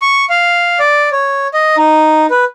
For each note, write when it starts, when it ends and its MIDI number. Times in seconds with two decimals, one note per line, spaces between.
0.02 0.25 85
0.30 0.79 77
0.79 1.09 74
1.12 1.47 73
1.54 1.76 75
1.77 2.26 63
2.30 2.45 71